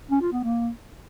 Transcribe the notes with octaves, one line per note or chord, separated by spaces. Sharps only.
C#4
F4
B3
A#3